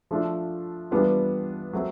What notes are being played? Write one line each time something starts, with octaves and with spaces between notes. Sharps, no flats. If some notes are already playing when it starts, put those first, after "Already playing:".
F3 A3 D4 F4
E3 G3 B3 D4 F4
F#3 A3 C4